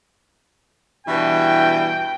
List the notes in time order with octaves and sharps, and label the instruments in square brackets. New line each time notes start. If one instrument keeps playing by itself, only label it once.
[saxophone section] G2 B2 E3 [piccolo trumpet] G5